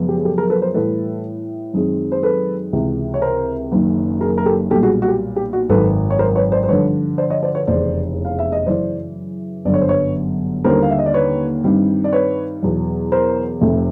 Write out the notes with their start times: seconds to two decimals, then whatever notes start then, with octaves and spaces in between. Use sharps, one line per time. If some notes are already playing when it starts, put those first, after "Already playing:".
Already playing: F#2 C#3 F3 G#3 B3
0.09 G4
0.17 G#4
0.25 G4 A4
0.38 G#4 A#4
0.50 A4 B4
0.62 A#4 C5
0.74 A2 E3 G3 A4 B4
1.74 F#2 D#3 G#3 C4
2.12 C5
2.23 A4 B4
2.73 C#2 C3 E3
3.14 C#5
3.22 A#4 C5
3.72 F#1 F#2 D#3
4.21 G#4 A#4
4.38 A#4
4.46 G4 A4
4.70 B1 A#2 G3 G4 A4
4.83 F#4 G#4
5.02 F#4
5.08 G4
5.36 G4
5.53 F#4
5.69 G#1 F#2 D#3 A4 B4
6.10 C#5
6.19 A#4 C5
6.36 B4 C#5
6.52 C5 D5
6.64 C5
6.68 G2 D3 F3 B4 C#5
7.18 C5 D5
7.30 C#5 D#5
7.43 C5 D5
7.55 B4 C#5
7.67 F1 E2 C#3 C5 D5
8.25 F5
8.39 E5
8.52 D#5
8.66 F#2 C#3 E3 C5 D5
9.65 G1 F#2 D3 D5
9.74 C#5
9.81 C5
9.89 B4 C#5
10.64 D#2 D3 G3 A#3 C#4 A#4 C5
10.82 F5
10.90 E5
10.99 D#5
11.06 D5
11.14 B4 C#5
11.63 G2 D#3 G3 C4 D#4
12.04 D5
12.13 B4 C#5
12.62 E2 B2 F#3
13.12 A#4 C5
13.61 F1 F2 C3 F3 A3